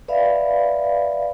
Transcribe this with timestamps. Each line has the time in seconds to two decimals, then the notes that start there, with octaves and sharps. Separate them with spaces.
0.08 B4 D5 E5 F5 B5